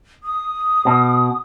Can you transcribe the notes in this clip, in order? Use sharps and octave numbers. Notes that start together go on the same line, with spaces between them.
D#6
B2